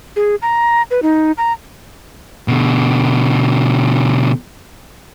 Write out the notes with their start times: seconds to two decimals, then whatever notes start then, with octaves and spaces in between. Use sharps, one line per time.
0.16 G#4
0.42 A#5
0.91 B4
1.02 D#4
1.38 A#5
2.48 B2 D3